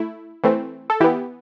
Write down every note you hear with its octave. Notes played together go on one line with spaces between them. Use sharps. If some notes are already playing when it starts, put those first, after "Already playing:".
Already playing: A3 E4
E3 A3 C4
A4
E3 B3 E4 G4